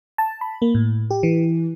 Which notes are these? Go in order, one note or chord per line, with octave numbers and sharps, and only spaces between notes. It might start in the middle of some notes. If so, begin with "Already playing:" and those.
A5
B5
A#3
A2
G4
E3